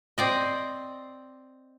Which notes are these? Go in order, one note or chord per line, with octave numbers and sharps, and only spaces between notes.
C4 D5 D#5